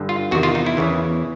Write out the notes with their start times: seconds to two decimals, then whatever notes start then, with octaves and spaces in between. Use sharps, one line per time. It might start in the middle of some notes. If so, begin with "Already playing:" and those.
Already playing: G2 D3
0.09 F4
0.31 E2 C3 D#3 F#4
0.43 F4
0.55 D#4
0.66 E4
0.77 E2 C#3 E3